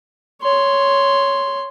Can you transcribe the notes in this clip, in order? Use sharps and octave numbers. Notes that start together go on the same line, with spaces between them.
C#5 C6